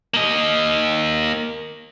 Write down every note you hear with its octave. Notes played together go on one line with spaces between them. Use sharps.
A#3 D#5